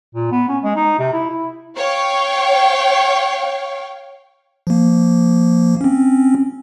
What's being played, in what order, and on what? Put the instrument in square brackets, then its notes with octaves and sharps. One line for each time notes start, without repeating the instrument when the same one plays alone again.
[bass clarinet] A#2
B3
C#4
G#3
D#4
C3
E4
E4
[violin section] C#5 F5 G5
[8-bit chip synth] F3 A#3
C4 C#4